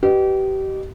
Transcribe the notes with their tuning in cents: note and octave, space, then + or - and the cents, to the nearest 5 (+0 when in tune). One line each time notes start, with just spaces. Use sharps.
G4 -30 B4 +0 D#5 -35